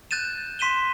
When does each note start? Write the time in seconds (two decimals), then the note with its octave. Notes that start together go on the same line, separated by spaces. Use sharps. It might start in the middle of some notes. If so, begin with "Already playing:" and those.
0.11 F#6 G6 A6 D#7 E7
0.59 C6 B6 D#7 E7 G7